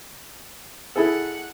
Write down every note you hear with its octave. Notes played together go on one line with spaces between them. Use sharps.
E4 G#4 A4 F#5